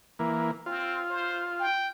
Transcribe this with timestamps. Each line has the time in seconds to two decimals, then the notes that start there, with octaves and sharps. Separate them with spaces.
0.19 E3 A#3
0.66 C4 F4
1.10 C5
1.59 G5